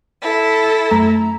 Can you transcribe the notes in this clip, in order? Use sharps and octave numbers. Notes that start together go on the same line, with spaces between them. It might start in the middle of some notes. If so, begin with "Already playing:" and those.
E4 A4
F#2 A3 A#5